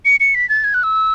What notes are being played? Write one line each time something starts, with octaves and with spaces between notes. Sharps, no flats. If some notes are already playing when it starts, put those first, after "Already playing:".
C#7
C#7
B6
A6
G#6
F#6
E6